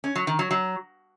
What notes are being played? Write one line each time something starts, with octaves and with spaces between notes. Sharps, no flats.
C#4
F#3
D#3
F#3
F#3